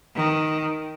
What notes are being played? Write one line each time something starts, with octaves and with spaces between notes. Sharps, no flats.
D#3